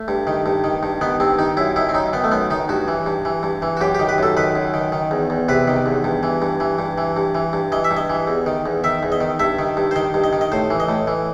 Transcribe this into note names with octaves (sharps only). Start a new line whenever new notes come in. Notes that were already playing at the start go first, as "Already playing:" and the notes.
Already playing: A3
G2
D#3
G2
D#3
G2
D#3 B3
G2 C4
D#3 D#4
F#2 E4
D#3 E4
C4
F#2 D#4
D#3 B3
A3
F#2 B3
D#3 D#4
G2 F#4
E3
G2
E3
G2
E3
F#4
F#2 G4
G4
D#3
B4
F#2 A4
D#3 B4
F#2
D#3
D#3
E2
E2
C3 B4
D#3
E2
G2
E3
G2
E3
G2
E3
G2
E3
G2
E3 D#5
E5
G2
D#5
E3
E2
D#3
E2
D#3 E5
E2
D#5
D#3
G2 E5
D#3
G2
C5
D#3 D#5
G2
D#5
D#3
D#5
A2 C5
E3
D#5
A2
E3